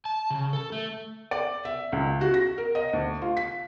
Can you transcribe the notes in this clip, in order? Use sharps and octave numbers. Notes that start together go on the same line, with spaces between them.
A5
C#3
A4
A3
D5
E5
C#2
F#4
A#6
A#4
D#5
D2
F4
B6